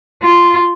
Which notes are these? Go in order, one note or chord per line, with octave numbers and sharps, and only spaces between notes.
F4